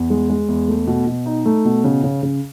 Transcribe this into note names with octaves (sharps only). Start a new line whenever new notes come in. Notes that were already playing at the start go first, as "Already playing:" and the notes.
Already playing: E2
G#3
G#3
E2
A3
B2
B2
D#4
A3
B2
C#3
C#3
C#3